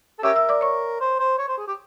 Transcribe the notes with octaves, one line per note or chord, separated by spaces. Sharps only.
A4
C#4 G4 A#4 E5 E6
E5 E6
D5 D6
C#5 C#6
C5
C5
C#5
C5
G#4
G4